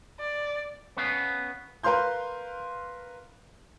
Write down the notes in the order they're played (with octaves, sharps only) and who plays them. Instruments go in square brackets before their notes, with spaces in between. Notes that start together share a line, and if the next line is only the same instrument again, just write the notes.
[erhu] D5
[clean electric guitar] B3 C#4 B4 F5
[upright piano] A#4 B4 F5 C6 G6